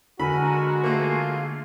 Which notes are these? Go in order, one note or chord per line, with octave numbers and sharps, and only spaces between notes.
D3 G#3 F#4 A#4 F#5 G#5 B5
A3 A#3 F4 G#4